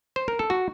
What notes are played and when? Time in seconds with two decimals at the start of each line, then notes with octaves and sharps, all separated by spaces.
0.16 C5
0.28 A#4
0.39 A4
0.50 F#4